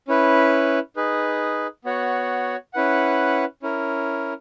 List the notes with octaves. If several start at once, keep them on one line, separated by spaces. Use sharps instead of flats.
C#4 E4 B4
D#4 G#4 B4
B3 F#4 C#5 F#5
C#4 E4 B4 F#5
C#4 E4 A#4